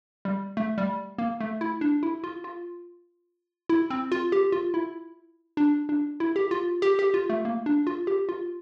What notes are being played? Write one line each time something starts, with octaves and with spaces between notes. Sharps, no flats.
G3
A3
G3
A#3
A3
E4
D4
E4
F4
F4
E4
C4
F4
G4
F4
E4
D4
D4
E4
G4
F4
G4
G4
F4
A3
A#3
D4
F4
G4
F4